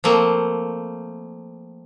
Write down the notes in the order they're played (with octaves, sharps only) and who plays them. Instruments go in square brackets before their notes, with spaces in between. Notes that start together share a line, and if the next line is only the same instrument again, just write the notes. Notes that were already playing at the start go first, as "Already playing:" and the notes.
[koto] F3 A3 A#3 C4